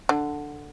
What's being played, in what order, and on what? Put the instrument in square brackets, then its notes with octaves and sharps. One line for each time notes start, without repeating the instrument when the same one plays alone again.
[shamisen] D3